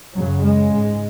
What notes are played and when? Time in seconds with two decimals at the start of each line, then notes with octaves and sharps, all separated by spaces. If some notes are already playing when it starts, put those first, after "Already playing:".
0.15 F#2 C#3 F#3
0.44 G#3
0.72 G#2